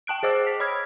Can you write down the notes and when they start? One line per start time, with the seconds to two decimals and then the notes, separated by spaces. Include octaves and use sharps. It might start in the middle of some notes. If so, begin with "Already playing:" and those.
0.07 G5 A5 F#6 D7
0.23 G#4 C5 D#5 D6 E6
0.47 B6
0.60 C#5 B5 D#6 F6 G#6